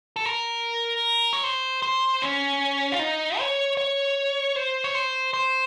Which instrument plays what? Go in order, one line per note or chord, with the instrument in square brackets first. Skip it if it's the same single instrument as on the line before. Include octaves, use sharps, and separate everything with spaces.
[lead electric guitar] A4
A#4
C#5
C5
C5
C#4
F4
D#4
C#5
C#5
C5
C#5
C5
C5